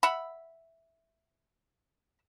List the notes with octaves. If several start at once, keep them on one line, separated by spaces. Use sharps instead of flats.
E5 F#5 B5